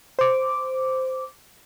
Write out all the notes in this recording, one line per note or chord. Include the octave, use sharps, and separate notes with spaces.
C5 D6